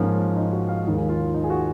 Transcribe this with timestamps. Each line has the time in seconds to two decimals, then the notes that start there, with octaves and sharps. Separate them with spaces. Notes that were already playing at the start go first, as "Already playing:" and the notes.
Already playing: G#2 F3 A#3 C#4
0.36 D#4
0.52 F#4
0.68 F5
0.84 D#2 D#3 G#3 D#5
0.97 G#4
1.09 F4
1.34 D#4
1.44 G#4
1.50 F#4